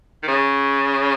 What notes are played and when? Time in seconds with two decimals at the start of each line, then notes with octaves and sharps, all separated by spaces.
0.23 D#3
0.28 C#3